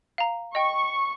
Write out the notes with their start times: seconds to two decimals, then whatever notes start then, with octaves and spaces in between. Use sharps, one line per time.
0.18 F5 A#5
0.55 D#5 G5 C#6